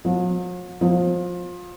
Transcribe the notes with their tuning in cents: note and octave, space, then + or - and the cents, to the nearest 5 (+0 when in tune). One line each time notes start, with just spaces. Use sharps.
F3 +45
F3 +20